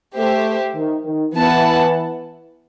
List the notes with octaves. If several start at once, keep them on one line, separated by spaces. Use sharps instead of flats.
A3 G4 C5 E5
D#3
D#3
E3 B3 E4 B4 F#5 A5